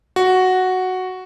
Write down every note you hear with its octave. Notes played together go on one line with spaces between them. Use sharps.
F#4